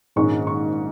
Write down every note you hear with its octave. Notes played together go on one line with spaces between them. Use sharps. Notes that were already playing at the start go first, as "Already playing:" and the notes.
A#1 G#2 D#3 G#3 C#4 C#6
C#6